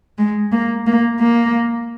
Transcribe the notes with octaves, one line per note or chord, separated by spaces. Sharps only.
G#3
A#3
A#3
A#3